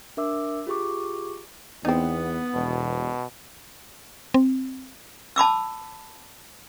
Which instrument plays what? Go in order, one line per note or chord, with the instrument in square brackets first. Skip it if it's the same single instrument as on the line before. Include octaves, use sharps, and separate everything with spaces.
[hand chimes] D4 A#4 E5 D6 E6
F4 G4 G#4 C#6 D6
[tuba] E2 [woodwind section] B3 [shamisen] C4 D#4
[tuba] E1 [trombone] B2
[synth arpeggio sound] C4
[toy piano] A5 B5 D6 E6